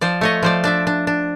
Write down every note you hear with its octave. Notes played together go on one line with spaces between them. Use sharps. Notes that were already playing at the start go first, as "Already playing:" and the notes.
F3 C5 D5
A3 C#5 D#5
F3 C5 D5
D4 D5 E5
D4
D4